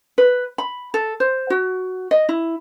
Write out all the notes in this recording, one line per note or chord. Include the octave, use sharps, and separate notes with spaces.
B4
B5
A4
C5
F#4
D#5
E4